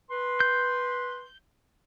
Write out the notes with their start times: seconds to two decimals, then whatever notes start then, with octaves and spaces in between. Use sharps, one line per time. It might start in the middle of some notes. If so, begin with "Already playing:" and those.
0.10 B4 C6
0.40 G6